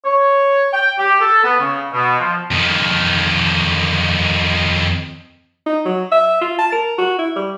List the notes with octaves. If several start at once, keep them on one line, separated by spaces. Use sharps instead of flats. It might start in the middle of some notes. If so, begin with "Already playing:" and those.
C#5
G5
G4
A4
B3
C#3
B2
F3
F2 D#3
D#4
F#3
E5
F4
A5
A#4
F#4
E4
G3